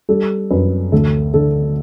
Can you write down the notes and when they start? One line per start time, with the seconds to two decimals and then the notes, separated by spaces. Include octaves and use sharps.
0.09 G3 A4
0.51 F#2 B4
0.92 D2 A4
1.34 D3 A4